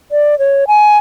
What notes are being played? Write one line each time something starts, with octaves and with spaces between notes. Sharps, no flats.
D5
C#5
G#5